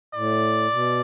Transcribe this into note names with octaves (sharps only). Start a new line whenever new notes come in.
A2 D5
B2